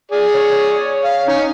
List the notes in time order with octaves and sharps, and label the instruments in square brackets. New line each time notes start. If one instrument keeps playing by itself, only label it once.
[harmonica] G#4 D5
[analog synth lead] C#5
[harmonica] F5
[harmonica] C#4 [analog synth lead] D#4